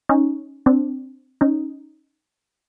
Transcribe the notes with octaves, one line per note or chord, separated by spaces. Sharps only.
C#4 D#4
C4 D4
C#4 D#4